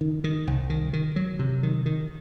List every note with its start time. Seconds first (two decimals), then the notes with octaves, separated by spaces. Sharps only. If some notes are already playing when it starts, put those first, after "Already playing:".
0.01 D#3
0.24 D#3
0.47 C2
0.70 D#3
0.93 D#3
1.16 F#3
1.39 C3
1.63 D#3
1.86 D#3